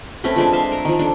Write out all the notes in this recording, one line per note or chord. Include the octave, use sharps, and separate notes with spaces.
A3 C4 C#4 B4
F3 G#3 D4
C5 E5 F5
A#4
D#3 F3
D4 A4